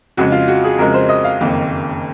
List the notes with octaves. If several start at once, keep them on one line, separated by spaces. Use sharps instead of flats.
F2 C#3 G#3 F#4
F4
F#4
G#4
F2 C#3 G#3 A#4
C5
D#5
F5
F#1 F2 D#3 A#3